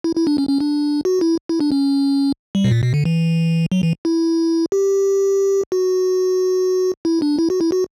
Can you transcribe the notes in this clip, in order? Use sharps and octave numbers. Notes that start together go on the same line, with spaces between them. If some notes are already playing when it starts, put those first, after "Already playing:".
E4
E4
D4
C#4
C#4
D4
F#4
E4
E4
D4
C#4
G3
B2
A#2
B2
D3
E3
F#3
E3
E4
G4
F#4
E4
D4
E4
F#4
E4
F#4